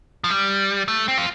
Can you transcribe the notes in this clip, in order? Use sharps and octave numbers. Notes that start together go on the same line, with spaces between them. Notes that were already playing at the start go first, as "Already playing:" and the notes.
F3
G3
A3
C4
F4